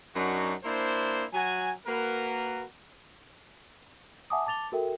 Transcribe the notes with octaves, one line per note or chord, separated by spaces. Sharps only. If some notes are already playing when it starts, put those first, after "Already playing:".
F#2 F#3 D4 D#4 F#4
A#3 D4 E4 C5
F#3 F#4 G#5
A#3 F#4 A#4 B4
E5 F#5 G#5 A5 D6 D#6
A5 D6 A6 F7 G7
F#4 A4 A#4 E5 G5